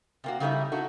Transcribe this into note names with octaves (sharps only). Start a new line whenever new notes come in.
C3 A#3 F#4
C#3 G3 A3 D#4 E4 E5
D#4 E4 F#4 A4